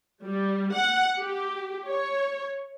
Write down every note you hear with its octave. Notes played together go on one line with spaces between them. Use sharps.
G3
F#5
G4
C#5